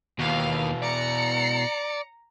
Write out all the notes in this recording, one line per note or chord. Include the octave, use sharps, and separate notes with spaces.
D#2 B2 E3 F5
D5 A#5 C#7